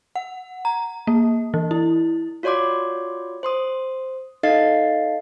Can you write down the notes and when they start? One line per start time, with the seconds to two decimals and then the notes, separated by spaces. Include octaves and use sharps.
0.16 F#5
0.65 A#5
1.07 A#3
1.54 E3
1.71 E4
2.43 F4 F#4 C#5 D5 C6 D6
3.43 C5 C6 D#6
4.43 D#4 A4 D#5 F5 A6 C7